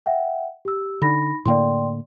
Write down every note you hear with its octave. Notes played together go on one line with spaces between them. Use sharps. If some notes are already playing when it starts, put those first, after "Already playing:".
E5 F#5 G5
G4 E6
D3 D#4 B5 A#6
A2 D3 A#3 D5 G5 C6